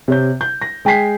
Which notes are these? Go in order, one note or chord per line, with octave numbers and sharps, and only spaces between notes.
C3 C#5 G6
G6
A#6
G#3 G5 G#5 B6 C7